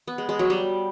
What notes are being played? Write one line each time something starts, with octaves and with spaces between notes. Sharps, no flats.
B3
G#3
G#3
F#3
G3